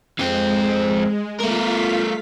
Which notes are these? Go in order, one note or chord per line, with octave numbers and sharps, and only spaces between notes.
F2 G#3 C4
A3 F4 A#4 F5 B6